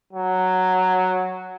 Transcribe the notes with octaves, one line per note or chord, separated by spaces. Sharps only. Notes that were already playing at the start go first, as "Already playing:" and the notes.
F#3